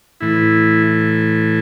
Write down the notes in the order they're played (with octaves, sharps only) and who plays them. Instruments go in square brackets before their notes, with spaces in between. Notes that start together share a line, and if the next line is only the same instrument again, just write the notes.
[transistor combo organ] A2 E3 E4